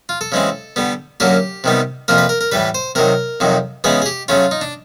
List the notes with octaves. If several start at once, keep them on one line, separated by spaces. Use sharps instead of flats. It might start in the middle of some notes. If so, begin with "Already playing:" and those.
F4
A4
C#3 E3 G#3 C4
D3 G3 B3
F#2 D3 F#3 A#3 G4
C3 D#3 G3 B3
F2 C3 F3 A#3 A#4
B4
A#4
A#4
A2 E3 G3 B4
C5
C3 D#3 F#3 A#4
F2 C3 D#3 F#3
C#3 E3 G#3 B3 G#4
G#4
G4
C#3 F#3 A3 C#4 F4
D#4
D4